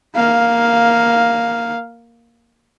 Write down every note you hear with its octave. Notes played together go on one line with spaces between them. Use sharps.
A#3 F5